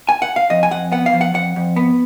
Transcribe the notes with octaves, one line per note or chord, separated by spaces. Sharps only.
G#5
F#5
F5
F2 D#5
G#5
F2 F#5
B3 F#5
F5
F3
F#5
F2 F#5
F2
B3